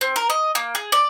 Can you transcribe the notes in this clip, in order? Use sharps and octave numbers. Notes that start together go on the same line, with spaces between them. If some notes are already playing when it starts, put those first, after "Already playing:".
C4
A#4
D#5
A#3
G#4
D5